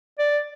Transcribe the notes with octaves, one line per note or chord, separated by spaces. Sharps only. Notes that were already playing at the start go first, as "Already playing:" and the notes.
D5